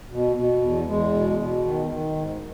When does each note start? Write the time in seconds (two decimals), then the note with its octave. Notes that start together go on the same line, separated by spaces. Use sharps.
0.11 B2
0.36 B2
0.62 E2
0.88 E2 G#3
1.13 B2
1.39 B2
1.65 D#3
1.90 D#3
2.16 G#2